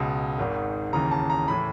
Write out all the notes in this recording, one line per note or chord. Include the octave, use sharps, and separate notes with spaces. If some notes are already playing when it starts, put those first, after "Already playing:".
Already playing: C#2 B2
G#1 G#2 D#3
D#2 C#3 E3 A#5
A5
A#5
A2 E3 B5